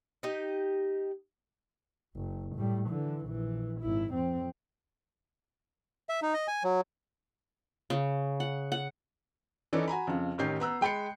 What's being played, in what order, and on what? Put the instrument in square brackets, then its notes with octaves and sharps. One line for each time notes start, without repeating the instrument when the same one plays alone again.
[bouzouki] D#4 G4 D#5
[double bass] F#1
A2 G3
D3 E3
A#1 E3
G#1 E4
F2 C4
[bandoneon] E5
D#4
D#5
G#5
F#3
[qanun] C#3
F#5
F#5
[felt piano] E3 C#4 D#4 A4 B4 D5
F#4 G#5 A#5 B5
F2 C#3
A1 D#3 C#4 G4 G6 C7
B3 A#5 E6 F#6
G#3 G5 B5 C7 C#7